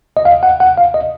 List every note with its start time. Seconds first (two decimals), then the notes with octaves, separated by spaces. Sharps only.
0.17 D#5
0.25 F5
0.43 F#5
0.60 F#5
0.78 F5
0.94 D#5